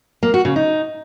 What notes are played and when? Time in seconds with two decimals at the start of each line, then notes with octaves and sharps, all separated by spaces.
0.23 A#3
0.34 F#4
0.45 C#3
0.56 D#4